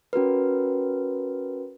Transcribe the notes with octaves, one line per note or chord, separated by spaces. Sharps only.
C#4 F#4 A#4 B4